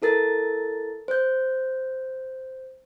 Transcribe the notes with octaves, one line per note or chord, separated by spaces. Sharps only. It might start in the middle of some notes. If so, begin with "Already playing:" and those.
E4 A4 A#4 A6
C5 G6